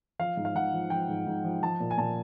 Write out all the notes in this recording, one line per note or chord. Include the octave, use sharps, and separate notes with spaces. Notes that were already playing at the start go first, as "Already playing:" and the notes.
F3 F5
G#2
F5
G#2 F#5
F3
F3 G5
G#2
G#2
F3
F3 A5
A#2
G#5
A#2 A5